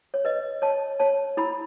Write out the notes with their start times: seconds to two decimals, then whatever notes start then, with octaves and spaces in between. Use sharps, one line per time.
0.14 C#5
0.25 B4 D#5
0.62 C#5 A5
1.00 C#5 A5
1.37 E4 B5